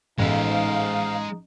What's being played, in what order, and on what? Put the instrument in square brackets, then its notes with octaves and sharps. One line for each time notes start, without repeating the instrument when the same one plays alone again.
[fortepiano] A1 [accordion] G#2 F5 [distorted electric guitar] G#3 E5 [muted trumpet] D#4